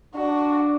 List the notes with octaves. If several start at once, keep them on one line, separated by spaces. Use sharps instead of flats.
D4 F#4